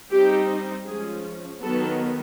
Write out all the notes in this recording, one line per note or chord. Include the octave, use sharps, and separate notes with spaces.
G3 C4 D#4 G4
F3 G#3 C#4 G#4
D#3 F#3 B3 A4